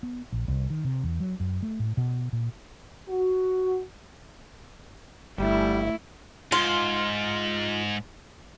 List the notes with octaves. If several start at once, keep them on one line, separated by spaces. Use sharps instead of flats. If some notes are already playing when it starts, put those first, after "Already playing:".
B3
A#1
C2
D#3
C3
E2
F#3
F#2
A3
A2
B2
A#2
F#4
G1 G3 A3 E4
G#2 F4